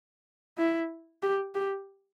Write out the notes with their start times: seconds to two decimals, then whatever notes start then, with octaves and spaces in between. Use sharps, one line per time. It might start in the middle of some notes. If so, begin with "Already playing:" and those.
0.58 E4
1.23 G4
1.55 G4